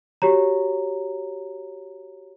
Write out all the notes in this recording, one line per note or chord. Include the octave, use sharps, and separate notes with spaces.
F#4 G4 C#5 A#5